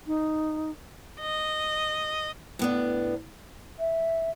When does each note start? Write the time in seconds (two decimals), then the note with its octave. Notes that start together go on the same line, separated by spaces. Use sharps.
0.07 D#4
1.20 D#5
2.59 A2 B3 D4
3.79 E5